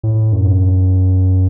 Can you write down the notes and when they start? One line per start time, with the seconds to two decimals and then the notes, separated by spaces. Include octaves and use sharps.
0.03 A2
0.33 F#2